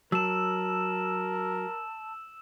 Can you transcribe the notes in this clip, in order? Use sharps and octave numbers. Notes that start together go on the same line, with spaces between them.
F#3 A#4 A5 E6 E7